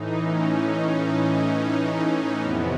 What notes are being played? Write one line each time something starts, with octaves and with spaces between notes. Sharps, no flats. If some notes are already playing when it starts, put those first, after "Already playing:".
Already playing: A2 E3 D#4
C#4
C#4
F2 C3 E3 B3